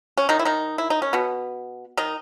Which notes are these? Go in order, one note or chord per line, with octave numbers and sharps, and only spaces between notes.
C#4
D#3 D#4
E4
D#3 D#4
E4
D#4
C#4
B2 B3
D#3 D#4